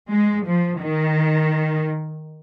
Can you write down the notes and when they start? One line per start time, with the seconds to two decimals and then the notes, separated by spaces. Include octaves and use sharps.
0.10 G#3
0.45 F3
0.81 D#3